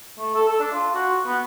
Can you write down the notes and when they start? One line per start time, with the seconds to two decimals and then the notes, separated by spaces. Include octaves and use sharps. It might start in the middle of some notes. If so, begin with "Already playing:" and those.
0.19 A3
0.34 A4
0.48 A4
0.60 D4
0.73 F4
0.94 F#4
1.26 B3